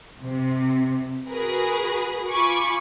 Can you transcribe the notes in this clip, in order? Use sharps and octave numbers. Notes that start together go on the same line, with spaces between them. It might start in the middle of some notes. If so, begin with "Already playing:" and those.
C3
F#4 G#4 A#4 B4
F4 G#5 B5 C#6 D6